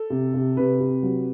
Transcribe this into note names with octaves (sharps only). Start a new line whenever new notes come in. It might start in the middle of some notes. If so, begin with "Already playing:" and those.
Already playing: A4
C3
C3
C3 B4
C3
F#3